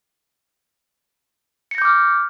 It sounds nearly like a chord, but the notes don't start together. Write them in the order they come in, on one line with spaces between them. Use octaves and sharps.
C#7 A#6 G6 D6 F6